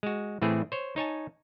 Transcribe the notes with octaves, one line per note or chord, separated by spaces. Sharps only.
G#3 F#4
A2 E3 A3 C4 G#4
C5 C#5
D#4 C#5 G#5 A5